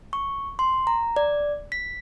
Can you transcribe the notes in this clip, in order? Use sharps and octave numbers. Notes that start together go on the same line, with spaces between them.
C#6
C6
A#5
D5
B6